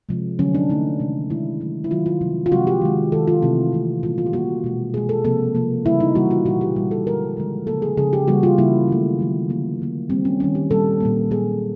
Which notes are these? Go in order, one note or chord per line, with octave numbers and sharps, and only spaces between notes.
C3 F3 G#3
D3 F#3 A3 C#4
D4
D3 F#3 A3 D#4
C3 D#3 G#3
C3 D#3 G#3 E4
D#3 F#3 A3
E4
D#3 F#3 A3 F4
F4
C3 F3 G#3
F4
C3 F3 G#3 F#4
G4
D#3 G#3
D#3 G#3 A4
F4
C3 E3 A3 E4
C3 E3 A3
A#2 G3 A#3 F4
F4
G4
A#2 G3 A#3 F#4
B2 G#3
B2 G#3 G#4
A4
C3 F3 A#3 A4
C3 F3 A#3
C#3 E3 G3 A#3 E4
D#4
C#3 E3 G3 A#3 F#4
F4
A#2 G3 A#3 F#4
G4
A#2 G3 A#3
A4
D3 F3 G#3 A#4
D3 F3 G#3
C#3 F3 A#3 A4
G#4
C#3 F3 A#3 G#4
G4
C#3 E3 G3 A#3 F#4
F4
C#3 E3 G3 A#3 E4
D#3 F#3 A3
D#3 F#3 A3
D3 F3 A#3
D3 F3 A#3
D#3 G3 A#3 C4
C#4
D#3 G3 A#3 C#4
G4
A#2 G3 A#3 A4
A#2 G3 A#3
A#2 F#3 A#3 G#4